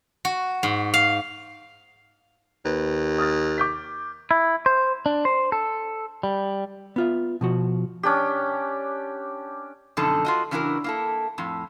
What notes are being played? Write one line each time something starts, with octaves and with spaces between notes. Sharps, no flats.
F#4
G#2
F5
D#2 B4
D#6 F6 A6
D6 G6 B6
E4
C5
D4
C5
A4
G3
B3 F4 E5
B2 F3 F#4
C#4 D4 G4
F#2 B2 D3 F3 D#4 A4
F4 F#4 D#5
C#3 E3 D4 E4 F#4 A#4
A#3 E4 A4
F2 A2